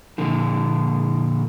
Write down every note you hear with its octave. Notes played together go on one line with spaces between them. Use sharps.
A#2 D3 F3